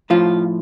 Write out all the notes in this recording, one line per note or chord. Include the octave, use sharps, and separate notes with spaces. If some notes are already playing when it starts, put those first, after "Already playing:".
A2 F3 F4